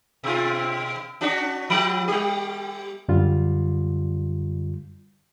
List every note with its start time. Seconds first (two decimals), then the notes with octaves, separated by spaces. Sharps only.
0.24 B2 F4
1.21 C#4 D4 F#4
1.70 F3 G4
2.08 G3 G4
3.08 F#2 D3 G3 F4